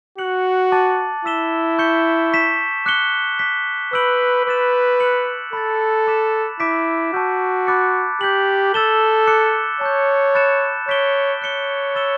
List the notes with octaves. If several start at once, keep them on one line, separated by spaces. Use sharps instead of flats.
F#4 F#6 C#7 F#7
A5 D6 A6
E4 E6 B6 E7 G7
C#6 G6 C#7 G7
C#6 G6 B6 E7
D6 F#6 C#7 G7
D6 F#6 B6
B4 B5 E6 G6 D7 F#7
B4 B5 D6 A6 E7
F#6 C#7 F#7
A4 B5 F#6 A6
A5 D6 F#6 B6 E7
E4 B5 D6 G6 B6 D7
F#4 A5 C#6 E6 G6
B5 D6 F#6 A6 C#7
G4 G6 B6 F#7
A4 E6 A6 E7 G7
D6 F#6 C#7
C#5 A5 E6 G6
B5 F#6 A6 C#7 E7
C#5 G6 B6 D7 G7
C#5 F#6 C#7 G7
B5 E6 A6 E7 G7